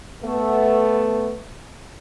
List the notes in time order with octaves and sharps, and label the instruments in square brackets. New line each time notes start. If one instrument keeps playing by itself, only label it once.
[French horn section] A3 B3